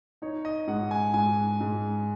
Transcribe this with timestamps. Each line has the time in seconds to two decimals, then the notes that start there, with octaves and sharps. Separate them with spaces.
0.22 D#4 C#5
0.45 D#5
0.67 G#2 F#5
0.91 G#5
1.14 G#2 G#5
1.60 G#2